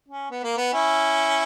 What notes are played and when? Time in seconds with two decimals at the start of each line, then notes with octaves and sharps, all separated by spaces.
0.08 C#4
0.31 B3
0.44 A#3
0.57 B3
0.73 C#4 E4